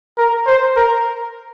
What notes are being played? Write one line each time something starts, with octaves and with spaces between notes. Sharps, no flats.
A#4
C5
A#4